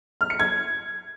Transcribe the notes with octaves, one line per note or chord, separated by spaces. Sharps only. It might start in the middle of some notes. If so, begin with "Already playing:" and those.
F6
C#7
G#6